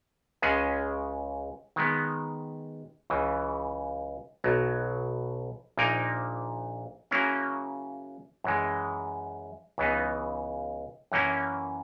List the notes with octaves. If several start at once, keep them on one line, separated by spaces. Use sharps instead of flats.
C#2 C#3 G#3 C#4 G#4
D#3 G#3 B3
C#2 C#3 E3
B1 B2 F#3
A#1 A#2 A#3 D#4 A#4
C#3 F#3 A#3 C#4 E4
F#2 E3 G#3
C#2 C#3 E3 B3 D#4
F#2 E3 A#3 C#4 E4